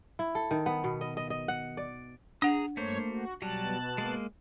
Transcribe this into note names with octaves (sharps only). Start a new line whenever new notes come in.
E4
A4
D#3
B3
B2
D#5
D#5
D#5
F#5
D5
D4 G#4 F#5 A#5 D#6
G2 A3 A#3 C5 C#5
F#4
B2 F#3 G3 A5 F#6
G#3 A#3